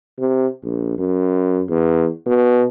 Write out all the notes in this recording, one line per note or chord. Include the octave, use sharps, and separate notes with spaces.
C3
A#1
F#2
E2
B2